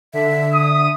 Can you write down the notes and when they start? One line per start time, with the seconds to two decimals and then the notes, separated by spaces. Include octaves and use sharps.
0.13 D3 E5
0.54 D#6